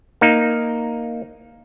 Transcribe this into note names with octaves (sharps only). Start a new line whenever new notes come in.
A#3 D#4